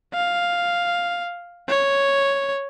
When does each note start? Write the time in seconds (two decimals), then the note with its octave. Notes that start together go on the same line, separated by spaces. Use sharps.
0.14 F5
1.69 C#5